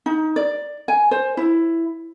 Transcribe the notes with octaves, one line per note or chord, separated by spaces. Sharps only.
D#4
D5
G#5
C5
E4